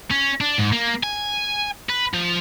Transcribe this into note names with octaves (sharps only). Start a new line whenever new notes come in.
C#4
D4
G#2
A#3
G#5
B4
F3